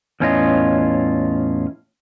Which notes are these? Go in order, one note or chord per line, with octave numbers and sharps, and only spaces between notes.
E2 A2 C#4 E4 F4 D#5